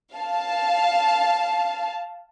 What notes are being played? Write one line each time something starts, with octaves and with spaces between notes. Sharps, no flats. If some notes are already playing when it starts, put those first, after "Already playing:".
F5 A5